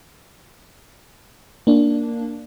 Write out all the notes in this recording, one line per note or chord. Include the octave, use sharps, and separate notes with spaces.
A#3 D4